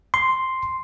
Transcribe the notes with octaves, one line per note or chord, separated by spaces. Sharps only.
C6